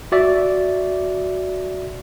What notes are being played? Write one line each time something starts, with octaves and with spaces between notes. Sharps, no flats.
F#4 D5 E5